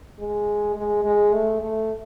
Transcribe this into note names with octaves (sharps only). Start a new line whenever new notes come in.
G#3
G#3
G#3
A3
A3